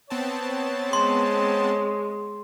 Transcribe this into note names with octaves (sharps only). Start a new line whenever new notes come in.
B3 C4 C#5 A5
G#3 C6